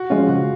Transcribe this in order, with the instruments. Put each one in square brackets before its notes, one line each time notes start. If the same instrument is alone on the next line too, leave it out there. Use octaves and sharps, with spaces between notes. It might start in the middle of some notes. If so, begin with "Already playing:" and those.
Already playing: [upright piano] F#4
[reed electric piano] F3 G#3 C#4 [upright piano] F4
[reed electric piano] C#3 [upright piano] F#4